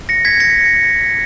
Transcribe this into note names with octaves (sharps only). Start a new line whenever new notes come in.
A#6 C#7
G#6 B6
A#6 C#7